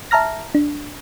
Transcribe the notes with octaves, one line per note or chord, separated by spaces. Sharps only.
E5 A5 A#5 F6 A#6
D4